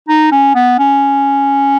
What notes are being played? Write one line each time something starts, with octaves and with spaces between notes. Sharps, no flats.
D#4
C#4
B3
C#4